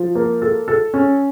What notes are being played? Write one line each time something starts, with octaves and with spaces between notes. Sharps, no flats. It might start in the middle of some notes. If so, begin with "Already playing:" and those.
Already playing: F3
A#3
A4
A4
C#4